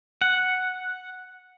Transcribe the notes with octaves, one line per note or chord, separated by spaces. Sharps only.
F#5